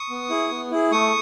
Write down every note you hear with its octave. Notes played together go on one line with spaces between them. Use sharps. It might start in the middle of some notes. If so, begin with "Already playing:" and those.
Already playing: C#6 D#6
B3
E4 G#4
B3
E4 G#4
A3 C#6 D#6